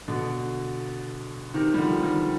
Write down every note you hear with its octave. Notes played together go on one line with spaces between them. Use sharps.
B2 D3
C3 D#3
G3
D3 F3
D#3 G3